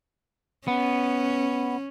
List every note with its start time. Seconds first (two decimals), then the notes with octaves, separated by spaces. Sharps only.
0.68 B3 C#4